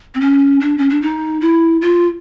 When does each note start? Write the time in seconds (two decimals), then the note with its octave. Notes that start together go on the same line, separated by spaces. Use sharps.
0.15 C4
0.20 C#4
0.60 D4
0.78 C#4
0.89 D4
1.02 D#4
1.41 E4
1.81 F4